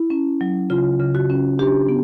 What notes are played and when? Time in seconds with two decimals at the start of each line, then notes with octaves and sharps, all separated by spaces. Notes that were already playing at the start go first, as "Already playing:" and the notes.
Already playing: E4
0.10 C#4
0.41 F#3
0.70 C#3 F4
1.00 C#3
1.15 F#4
1.30 C#4
1.59 D4 G4
1.89 B3